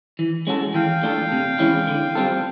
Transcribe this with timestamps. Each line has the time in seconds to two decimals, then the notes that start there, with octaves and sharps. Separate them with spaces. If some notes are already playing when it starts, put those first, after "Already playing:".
0.19 E3
0.47 G#3 C#4 F#4 A4
0.74 E3 F5 G5
1.03 A3 D4 F4 A4
1.32 C3
1.59 E3 G#3 C#4 E4
1.87 D3
2.15 G3 C4 F4 A4